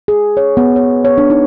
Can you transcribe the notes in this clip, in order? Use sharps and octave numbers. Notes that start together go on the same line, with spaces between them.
G#4
C#5
B3
C#5
C#5
D4
D#4